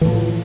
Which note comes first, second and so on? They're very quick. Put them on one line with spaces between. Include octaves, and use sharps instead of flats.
E3 A2 F3